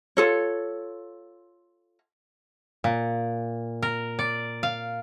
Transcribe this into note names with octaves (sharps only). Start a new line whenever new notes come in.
F4 A4 C#5
A#2
A#4
D5
F5